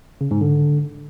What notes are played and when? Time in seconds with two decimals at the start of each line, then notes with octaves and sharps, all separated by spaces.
0.21 C#3
0.31 G#2
0.41 D3